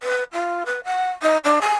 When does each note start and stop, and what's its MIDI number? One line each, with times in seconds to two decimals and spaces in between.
0.03 0.23 71
0.32 0.63 65
0.66 0.80 71
0.84 1.10 78
1.22 1.37 63
1.44 1.58 62
1.61 1.74 80